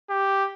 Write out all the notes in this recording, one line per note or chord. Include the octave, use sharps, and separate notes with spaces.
G4